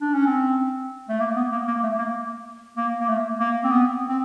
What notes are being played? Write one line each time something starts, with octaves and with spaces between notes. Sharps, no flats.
D4
C#4
C4
A3
A#3
B3
A#3
A#3
A3
A#3
A#3
A#3
A3
A#3
C4
B3
C4